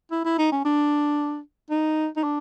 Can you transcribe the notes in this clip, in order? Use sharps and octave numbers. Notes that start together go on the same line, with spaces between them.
E4
E4
D#4
C#4
D4
D#4
D#4
D4